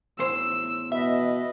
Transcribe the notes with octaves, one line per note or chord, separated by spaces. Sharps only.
E2 A2 C5 E6
B2 B4 D#5 E5